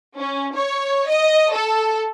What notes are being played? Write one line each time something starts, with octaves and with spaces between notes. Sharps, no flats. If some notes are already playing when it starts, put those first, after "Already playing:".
C#4
C#5
D#5
A4